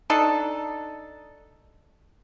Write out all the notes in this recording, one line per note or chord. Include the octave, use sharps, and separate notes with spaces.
D4 D#4 A4